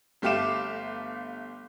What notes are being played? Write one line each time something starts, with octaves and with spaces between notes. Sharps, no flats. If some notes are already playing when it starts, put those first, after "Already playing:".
G1 A3 G4 F5 D6 E7